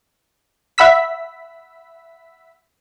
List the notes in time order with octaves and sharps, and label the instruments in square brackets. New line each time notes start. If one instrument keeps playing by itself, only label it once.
[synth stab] E5 F#5 B5 E6 B6